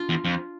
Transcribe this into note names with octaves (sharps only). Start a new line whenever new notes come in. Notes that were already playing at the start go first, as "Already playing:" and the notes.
Already playing: D4 F4
E2
F2